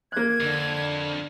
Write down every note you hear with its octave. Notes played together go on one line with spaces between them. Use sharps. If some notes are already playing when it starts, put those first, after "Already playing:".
A#3 F#6 G#6
F2 D3